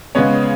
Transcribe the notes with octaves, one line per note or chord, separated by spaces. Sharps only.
C#3 G#3 B3 C#5